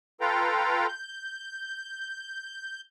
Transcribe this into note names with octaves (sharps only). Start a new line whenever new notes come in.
F4 A4 B4 F5 G5 A#5
G6